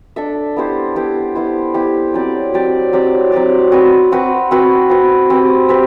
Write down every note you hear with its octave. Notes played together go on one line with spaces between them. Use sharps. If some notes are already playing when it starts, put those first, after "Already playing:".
D4 A4 E5
B3 E4 G4 C5
B3 E4 G4 C5
B3 E4 G4 C5
B3 E4 G4 C5
F#3 C4 G4 D5
F#3 C4 G4 D5
F#3 C4 G4 D5
F#3 C4 G4 D5
C4 F#4 B4
C4 F#4 B4
C4 F#4 B4
C4 F#4 B4
C4 G4 B4
C4 G4 B4